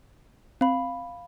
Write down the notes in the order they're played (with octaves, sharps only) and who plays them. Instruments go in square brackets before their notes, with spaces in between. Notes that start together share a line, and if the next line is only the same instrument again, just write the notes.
[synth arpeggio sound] C4 [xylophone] F5 B5